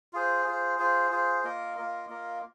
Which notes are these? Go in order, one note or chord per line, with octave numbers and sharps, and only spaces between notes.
F4 G#4 C5
F4 G#4 C5
F4 G#4 C5
F4 G#4 C5
A#3 F4 A#4 D#5
A#3 F4 A#4 D#5
A#3 F4 A#4 D#5